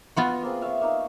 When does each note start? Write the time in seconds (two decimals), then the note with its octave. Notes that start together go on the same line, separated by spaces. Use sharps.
0.16 B3 F4 F#4
0.43 A#3 C4 G#4
0.62 C#5 E5 F5
0.82 A#3 D#4 E6